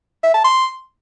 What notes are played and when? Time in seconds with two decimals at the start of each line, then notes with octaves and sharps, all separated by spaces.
0.24 E5
0.34 A5
0.44 C6